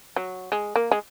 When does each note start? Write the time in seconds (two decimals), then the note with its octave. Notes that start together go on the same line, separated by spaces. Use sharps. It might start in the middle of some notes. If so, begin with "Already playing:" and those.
0.16 F#3
0.52 G#3
0.76 A#3
0.91 G#3